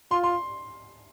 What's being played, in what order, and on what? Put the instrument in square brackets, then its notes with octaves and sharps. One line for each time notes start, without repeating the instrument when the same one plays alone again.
[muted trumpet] F4 [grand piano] C6
[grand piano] C6